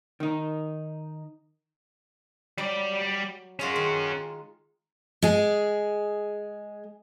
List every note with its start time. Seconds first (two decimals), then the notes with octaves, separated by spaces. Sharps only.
0.20 D#3 D#4
2.58 F#3 G3 D5
3.59 G#3 C#4 F4 F#4 G#4
3.76 D#3
5.22 G#3 G#4